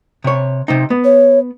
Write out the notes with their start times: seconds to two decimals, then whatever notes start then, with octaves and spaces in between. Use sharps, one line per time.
0.24 C3 C#5
0.68 C3 C4 D#4
0.90 B3
1.05 C#5